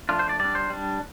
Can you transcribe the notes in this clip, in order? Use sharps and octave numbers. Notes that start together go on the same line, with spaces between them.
F3 A3 D4 F4
C5
D5
G3 D4 D5
C5
G3 D4